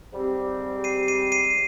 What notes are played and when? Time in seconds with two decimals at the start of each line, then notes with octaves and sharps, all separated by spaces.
0.12 G#2 G3 C4 G4
0.84 C7 D#7
1.08 C7 D#7
1.32 C7 D#7